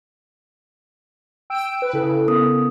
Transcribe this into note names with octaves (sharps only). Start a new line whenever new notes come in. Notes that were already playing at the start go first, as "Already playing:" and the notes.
G5 E6 D7
B4
C#3 E4 A4
B3 A#4 D#6